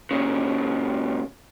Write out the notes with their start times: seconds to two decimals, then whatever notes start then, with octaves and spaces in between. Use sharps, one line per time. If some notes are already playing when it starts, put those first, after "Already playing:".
0.11 A#2 C#3